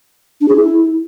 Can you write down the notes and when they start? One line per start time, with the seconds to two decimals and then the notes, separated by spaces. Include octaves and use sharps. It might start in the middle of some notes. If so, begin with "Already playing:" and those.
0.41 D4
0.48 G#4
0.56 E4